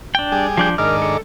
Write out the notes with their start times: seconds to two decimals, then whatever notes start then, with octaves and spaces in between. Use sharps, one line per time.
0.15 D4 G5
0.32 G3 G#4
0.57 F3 D4 G6
0.78 G#2 D#3 D4 A#4 F6
1.02 A4